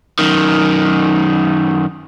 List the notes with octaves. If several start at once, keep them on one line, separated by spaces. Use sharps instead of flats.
F#2 D#3